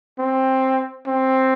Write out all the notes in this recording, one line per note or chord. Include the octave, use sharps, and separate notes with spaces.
C4
C4